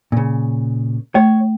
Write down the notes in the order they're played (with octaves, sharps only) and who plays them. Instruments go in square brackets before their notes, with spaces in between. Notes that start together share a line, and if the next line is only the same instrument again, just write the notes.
[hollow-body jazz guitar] A#2 C#3
[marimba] A3 [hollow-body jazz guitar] C#5